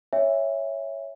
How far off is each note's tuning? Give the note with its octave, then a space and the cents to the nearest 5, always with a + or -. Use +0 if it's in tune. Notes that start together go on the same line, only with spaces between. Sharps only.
C#5 +0 E5 +0 G#5 -45